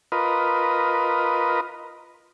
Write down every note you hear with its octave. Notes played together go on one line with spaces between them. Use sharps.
F4 A#4 B4 D#5